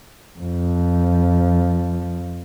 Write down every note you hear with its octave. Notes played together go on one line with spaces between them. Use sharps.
F2 F3